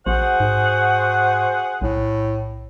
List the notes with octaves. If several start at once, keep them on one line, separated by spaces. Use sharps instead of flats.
A#1 F#4 G#4 C5 F#5
G#2
B1 A2